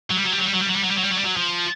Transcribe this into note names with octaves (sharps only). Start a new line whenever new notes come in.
F#3
G3
F#3
G3
F#3
G3
F#3
G3
F#3
G3
F#3
G3
F#3
G3
F#3
G3
F#3
F3